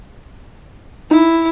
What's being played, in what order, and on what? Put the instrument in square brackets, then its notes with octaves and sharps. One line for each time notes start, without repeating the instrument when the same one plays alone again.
[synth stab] D#4 [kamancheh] E4